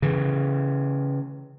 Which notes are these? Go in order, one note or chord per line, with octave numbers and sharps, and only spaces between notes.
C#3 E3